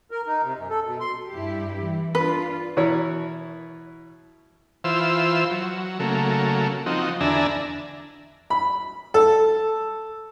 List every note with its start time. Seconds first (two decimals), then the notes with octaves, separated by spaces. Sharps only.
0.11 A#4
0.27 D#4
0.44 C3
0.56 F#2
0.70 A4
0.86 B2
1.00 C6
1.31 G2 E4 G4
1.83 E3
2.15 D4 F4 B4
2.77 B2 E3 E4 A#4 C#5
4.84 E3 F4 C5 E6
5.51 F#3
6.00 C#3 F#3 A3 A#3
6.86 F3 C4 D#4 F#4
7.20 E2 D3 D4 E5 G#5 A#5
8.50 B5
9.14 A4